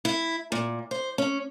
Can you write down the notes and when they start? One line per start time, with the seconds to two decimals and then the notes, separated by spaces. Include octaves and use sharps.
0.05 E4
0.52 A#2
0.91 C5
1.18 C#4